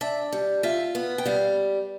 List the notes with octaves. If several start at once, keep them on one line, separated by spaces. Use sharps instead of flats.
D4 E5
G3
F4 E5
B3
G5
G3 F5